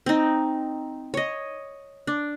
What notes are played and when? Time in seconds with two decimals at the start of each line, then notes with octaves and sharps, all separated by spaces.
0.06 C4 D#4
1.14 C#5 D#5
2.07 D4